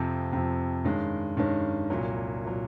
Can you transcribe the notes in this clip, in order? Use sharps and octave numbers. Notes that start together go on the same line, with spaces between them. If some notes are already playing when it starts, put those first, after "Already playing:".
Already playing: F2 C3 F3
F2 C3 F3
G2 D#3 G#3 C#4
G2 D#3 G#3 C#4
C2 A#2 F#3
A#2 F#3